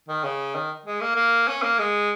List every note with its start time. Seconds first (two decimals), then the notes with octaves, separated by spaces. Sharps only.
0.08 D#3
0.23 C#3
0.55 D#3
0.86 G#3
1.01 A#3
1.16 A#3
1.48 C#4
1.62 A#3
1.79 G#3